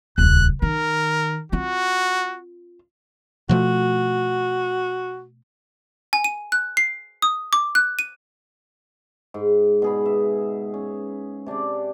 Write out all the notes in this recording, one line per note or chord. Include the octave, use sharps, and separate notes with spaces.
D#1 C#2 F#6
D#3 A#4
C4 F4 F#4
B2 F3 A3 F#4
G#5
D#7
F#6
C7
D#6
D6
F#6
D#7
G#2
B2 G#4 B5
E5
C#4
C3 D4 G4 D5